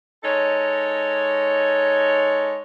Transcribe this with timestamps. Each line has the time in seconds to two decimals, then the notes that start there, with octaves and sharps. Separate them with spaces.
0.24 G#3 D#4 A4 C#5